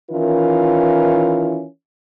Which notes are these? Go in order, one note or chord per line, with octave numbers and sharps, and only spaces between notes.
D#3 E3 C#4 E4 F4 A#4